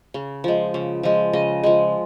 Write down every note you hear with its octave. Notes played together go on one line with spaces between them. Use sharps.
C#3
F3 G#3
C#3
F3 G#3
C#3 D#5
F3 G#3